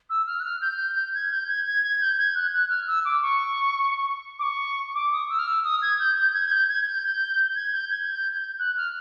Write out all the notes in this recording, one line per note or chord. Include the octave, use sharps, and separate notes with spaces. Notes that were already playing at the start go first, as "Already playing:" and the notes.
E6
F6
F#6
F6
G6
G6
G6
G#6
G6
G#6
G#6
G#6
G6
G#6
F#6
F#6
F6
E6
D6
C#6
D6
C#6
D6
D#6
E6
F6
E6
D#6
G#6
G6
G6
G#6
G#6
G6
G#6
G6
G6
G#6
G6
G#6
G6
F#6
F6